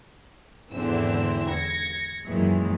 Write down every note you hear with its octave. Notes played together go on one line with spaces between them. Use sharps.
G#1 E2 D3 E3 C4 E6
G#6 A#6 C#7
F#2 A#2 D#3 E3 F#3 G#3